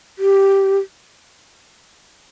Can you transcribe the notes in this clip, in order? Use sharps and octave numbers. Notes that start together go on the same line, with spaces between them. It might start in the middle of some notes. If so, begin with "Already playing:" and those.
G4